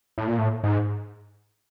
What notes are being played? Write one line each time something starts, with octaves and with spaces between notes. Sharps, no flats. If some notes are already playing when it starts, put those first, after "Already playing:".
A2
A#2
A2
G#2